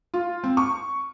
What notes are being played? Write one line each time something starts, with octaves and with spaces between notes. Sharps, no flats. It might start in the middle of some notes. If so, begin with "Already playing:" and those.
F4
C4
C#6